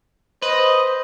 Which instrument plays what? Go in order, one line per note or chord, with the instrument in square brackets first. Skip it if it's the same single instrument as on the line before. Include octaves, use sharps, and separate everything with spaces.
[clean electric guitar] B4 [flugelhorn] C5 [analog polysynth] D#5